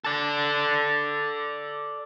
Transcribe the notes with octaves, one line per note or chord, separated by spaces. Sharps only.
A4 D5